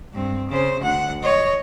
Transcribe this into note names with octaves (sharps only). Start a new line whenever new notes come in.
G2 C4
C#3 C5
D2 F#5
C#5 D#5